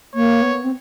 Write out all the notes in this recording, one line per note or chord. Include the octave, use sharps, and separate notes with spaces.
A#3 C#5
B3
C4